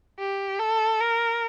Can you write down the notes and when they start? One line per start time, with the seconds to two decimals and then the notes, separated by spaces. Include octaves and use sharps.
0.19 G4
0.59 A4
1.00 A#4